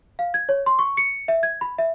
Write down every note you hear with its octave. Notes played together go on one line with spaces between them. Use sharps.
F5
G#6
C#5
C6
C#6
C#7
E5
G#6
B5
E5